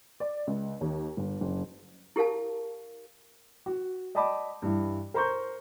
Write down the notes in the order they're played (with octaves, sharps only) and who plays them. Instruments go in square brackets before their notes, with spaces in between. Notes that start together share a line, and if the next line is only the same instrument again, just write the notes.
[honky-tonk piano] D5
C#2
D#2
G1
F#1
[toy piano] E4 G4 A#4 F5 A5
[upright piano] F#4
D5 D#5 G5 A5 B5 D6
G2 E3
A#4 C5 A#5 C6 C#6 G6